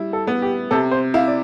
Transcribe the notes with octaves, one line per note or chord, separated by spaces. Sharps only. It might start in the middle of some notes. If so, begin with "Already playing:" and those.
Already playing: G3 E4
A4
B3
G4
C3 A4
C5
E4 F5
D5